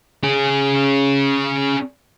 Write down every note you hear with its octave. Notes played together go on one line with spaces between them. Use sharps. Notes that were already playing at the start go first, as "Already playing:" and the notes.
C#4 G#4